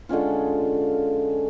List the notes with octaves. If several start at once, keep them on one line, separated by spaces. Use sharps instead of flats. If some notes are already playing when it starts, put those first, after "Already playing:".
D3 G#3 C#4 F4